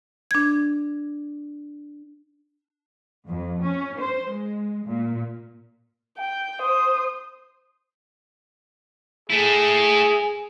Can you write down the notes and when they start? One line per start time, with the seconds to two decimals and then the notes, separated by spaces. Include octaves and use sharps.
0.31 D4 G#6
3.27 F2
3.63 C#4
3.99 C5
4.30 G#3
4.85 A#2
6.17 G5
6.61 C5 D#6
9.30 A3 E4 G#4